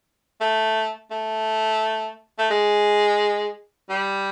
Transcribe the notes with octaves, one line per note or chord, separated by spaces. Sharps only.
A3
A3
A3
G#3
G3